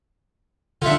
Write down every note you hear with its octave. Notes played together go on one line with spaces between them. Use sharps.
D3 F4 E5 F#5